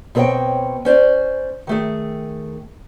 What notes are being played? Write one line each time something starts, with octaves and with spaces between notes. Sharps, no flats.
B2 C4 A4 C#5 D#5 G5
C#4 C5 D5
D#3 A3 G#4